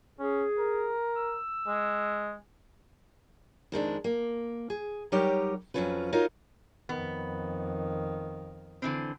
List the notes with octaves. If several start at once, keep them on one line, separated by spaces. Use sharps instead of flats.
C#4 G#4
A#4
E6
G#3
F2 D#3 G#3 D4
A#3
G#4
F#3 G3 D#4 G4 A#4 C#5
F2 A#2 F#3 C#4 F4 B4
D#4 F4 F#4 A#4 C#5
F2 D#3 B3
D3 E3 C4